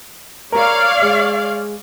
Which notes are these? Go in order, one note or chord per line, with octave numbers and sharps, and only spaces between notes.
A#4 C#5 D5 F5
G#3